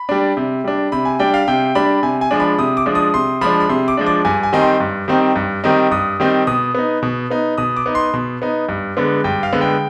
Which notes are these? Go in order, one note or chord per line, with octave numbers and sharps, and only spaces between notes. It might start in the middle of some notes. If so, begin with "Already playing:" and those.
Already playing: B5
G3 D4
C3
G3 D4
C3 B5
G#5
G3 D4 G5
F5
C3 G5
G3 D4 B5
C3 G#5
G#5
F3 G#3 D4
B5
C3 D#6
D6
F3 G#3 D4
D#6
C3 C6
F3 G#3 D4 B5
B5
C3 C6
D6
F3 G#3 D4
D6
G2 G#5
G#5
D#3 G3 C4 D#4
C6
G2
D#3 G3 C4 D#4
G2
D#3 G3 C4 D#4
G2 D#6
D#3 G3 C4 D#4
B2 D#6
B3 D#4
B2
B3 D#4
B2 D#6
D6
B3 D#4
C6
B2
B3 D#4
G2
D3 G#3 B3
G2 G5
F5
D3 G#3 B3
G5